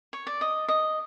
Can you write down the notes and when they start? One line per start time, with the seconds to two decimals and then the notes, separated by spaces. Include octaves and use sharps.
0.13 C#5
0.27 D5
0.41 D#5
0.68 D#5